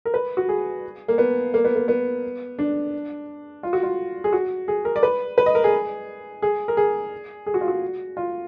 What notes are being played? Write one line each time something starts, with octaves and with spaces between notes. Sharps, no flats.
A#4
B4
F#4
G#4
A#3
B3
A#3
B3
A#3
B3
D4
F4
F#4
F4
G#4
F#4
G#4
A#4
D5
B4
B4
D#5
A#4
G#4
G#4
A#4
G#4
G#4
F#4
F4
F#4
F4